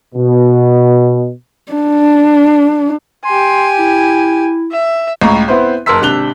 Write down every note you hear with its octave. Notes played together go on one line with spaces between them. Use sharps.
B2
D4
G4 G#5 C6
E4
E5
C#2 A2 A#5 C#6
B3 C4 E4 B4 C5
F#1 A#4 A5 C6 E6 B6
G#1 C3 D4 F#6 F7 G7